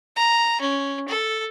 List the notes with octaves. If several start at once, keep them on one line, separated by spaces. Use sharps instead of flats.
A#5
C#4
A4